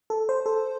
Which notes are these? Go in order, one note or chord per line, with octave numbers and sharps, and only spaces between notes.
A4
C5
A4